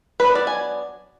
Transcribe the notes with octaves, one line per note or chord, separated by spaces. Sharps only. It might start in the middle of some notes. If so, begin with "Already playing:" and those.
F#3 B3 D4 B4
D5
G#5